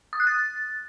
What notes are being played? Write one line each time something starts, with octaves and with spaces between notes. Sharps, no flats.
D#6
F#6
A6